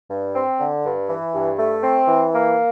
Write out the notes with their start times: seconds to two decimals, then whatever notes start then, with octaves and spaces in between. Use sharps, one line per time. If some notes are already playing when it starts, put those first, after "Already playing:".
0.11 G2
0.35 C4
0.60 D3
0.84 G2
1.09 E3
1.34 G2
1.59 A3
1.83 C4
2.08 E3
2.33 A#3